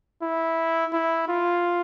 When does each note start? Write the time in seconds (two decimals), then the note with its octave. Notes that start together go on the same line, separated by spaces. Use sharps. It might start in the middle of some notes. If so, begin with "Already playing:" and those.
0.22 E4
0.93 E4
1.28 F4